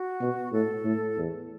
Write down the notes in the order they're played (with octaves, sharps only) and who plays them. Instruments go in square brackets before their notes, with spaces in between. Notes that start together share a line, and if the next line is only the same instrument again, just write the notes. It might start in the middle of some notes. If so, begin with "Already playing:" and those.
Already playing: [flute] F#4
[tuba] B2
[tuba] A2 [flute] A4
[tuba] A2
E2